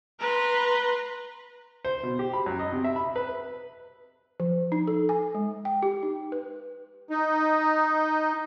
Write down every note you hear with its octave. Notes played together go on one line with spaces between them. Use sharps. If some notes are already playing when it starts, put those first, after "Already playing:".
B4 A#5 C6
C5
B2
G4
B5
F#2
D#5
C3
E5
B5
B4
F3
D#4
A4
G#5
G#3
G5
G4
D#4
B4
D#4